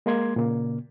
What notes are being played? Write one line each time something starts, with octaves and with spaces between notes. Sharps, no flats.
G#3 A#3 C6 G#6
A#2 C#3 A#3